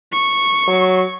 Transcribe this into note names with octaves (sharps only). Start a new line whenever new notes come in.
C#6
F#3